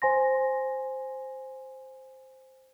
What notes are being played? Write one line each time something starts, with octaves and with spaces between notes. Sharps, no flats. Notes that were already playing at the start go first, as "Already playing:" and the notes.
C5 G#5 C6 A#6